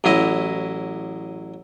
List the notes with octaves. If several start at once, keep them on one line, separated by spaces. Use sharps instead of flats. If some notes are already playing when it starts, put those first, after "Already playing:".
A1 F#3 E4 D#5